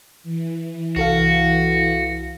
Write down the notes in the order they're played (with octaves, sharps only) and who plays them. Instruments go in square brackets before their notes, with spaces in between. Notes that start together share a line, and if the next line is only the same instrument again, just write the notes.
[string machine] E3
[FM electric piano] C2 A4 F5 [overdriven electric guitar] F#4